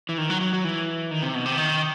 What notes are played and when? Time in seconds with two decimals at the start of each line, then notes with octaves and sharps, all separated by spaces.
0.09 E3
0.18 D#3
0.30 F#3
0.41 F#3
0.53 F#3
0.64 E3
1.11 D#3
1.23 C3
1.35 B2
1.46 C3
1.57 D#3